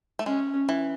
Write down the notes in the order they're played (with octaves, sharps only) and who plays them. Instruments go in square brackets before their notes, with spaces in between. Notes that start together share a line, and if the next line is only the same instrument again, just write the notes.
[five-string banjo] A3
[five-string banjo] G#3 [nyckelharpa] C#4
[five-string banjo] E3